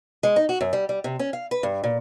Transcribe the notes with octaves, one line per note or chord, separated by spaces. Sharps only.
G#3
D#4
F#4
F#2
G3
G3
C3
C#4
F5
B4
G2
A#2